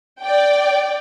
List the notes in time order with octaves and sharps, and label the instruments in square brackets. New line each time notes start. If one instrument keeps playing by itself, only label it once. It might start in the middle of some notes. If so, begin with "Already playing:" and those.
[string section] D5 G5